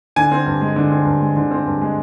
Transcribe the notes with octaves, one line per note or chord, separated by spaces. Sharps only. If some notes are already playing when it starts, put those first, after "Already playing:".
D3 G#5
C4
G2
G#3
D3
C4
G2
G#3
D3
C4
G2
G#3